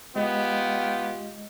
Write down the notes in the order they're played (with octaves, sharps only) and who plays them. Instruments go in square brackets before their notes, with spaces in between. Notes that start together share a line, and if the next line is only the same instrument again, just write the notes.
[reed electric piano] G#3 D#5 [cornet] B3 [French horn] F4 [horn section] G4